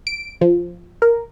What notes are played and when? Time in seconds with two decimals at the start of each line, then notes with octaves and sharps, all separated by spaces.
0.07 D7
0.41 F3
1.02 A#4